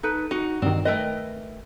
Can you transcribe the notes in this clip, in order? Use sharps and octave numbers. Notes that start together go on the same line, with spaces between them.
D#4 A4 B4
D#4 F#4
G2 D#3 C4
A3 A#4 B4 D#5 E5 G5